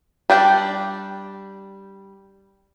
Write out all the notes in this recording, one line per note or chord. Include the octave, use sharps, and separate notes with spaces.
G3 D4 G5